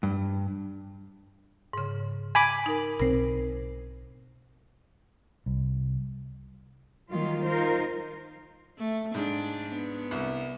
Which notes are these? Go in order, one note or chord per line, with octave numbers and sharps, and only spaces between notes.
G2
G#2 C#3
G#5 B5 D6
D#4 A#4
B1 B2 C4 A#4 C5
C2
D#3 F#3 G3 A#3 F4
D#4 F4 A#4 C5
A3
G#2 D4
B3
C2